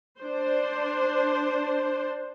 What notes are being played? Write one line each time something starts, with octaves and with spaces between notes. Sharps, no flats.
D4 C5